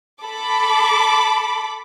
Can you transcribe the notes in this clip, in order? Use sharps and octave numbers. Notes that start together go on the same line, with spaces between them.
A4 B5 D6